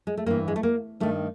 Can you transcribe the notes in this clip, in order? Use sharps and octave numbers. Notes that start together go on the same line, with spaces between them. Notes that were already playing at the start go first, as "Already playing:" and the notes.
G#3
A3
G2 E3 A#3
G#3
A3
A#3
G2 D#3 A3